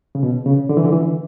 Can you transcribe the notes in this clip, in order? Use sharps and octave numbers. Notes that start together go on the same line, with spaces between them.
C#3
B2
C#3
D3
E3
D3
E3